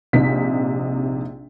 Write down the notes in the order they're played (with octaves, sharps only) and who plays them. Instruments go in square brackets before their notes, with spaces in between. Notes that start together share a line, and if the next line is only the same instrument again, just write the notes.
[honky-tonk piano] A#1 C3 D#4 B6